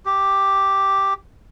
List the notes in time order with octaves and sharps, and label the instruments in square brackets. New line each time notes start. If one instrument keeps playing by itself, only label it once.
[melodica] G4